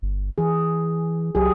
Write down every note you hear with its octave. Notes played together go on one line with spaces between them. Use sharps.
G1
E3 G#4
C2 F#3 G4 G#4